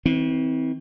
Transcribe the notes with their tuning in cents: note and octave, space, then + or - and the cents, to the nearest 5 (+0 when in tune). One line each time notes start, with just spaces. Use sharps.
E3 -40 C4 +0